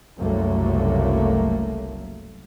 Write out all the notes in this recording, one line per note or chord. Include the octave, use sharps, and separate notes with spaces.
F#1 C2 F#2 F#3 A3 A#3